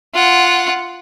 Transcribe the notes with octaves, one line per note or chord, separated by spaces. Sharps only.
F4 F#5